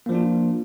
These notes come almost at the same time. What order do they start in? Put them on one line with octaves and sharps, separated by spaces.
A#3 F3 D4 F4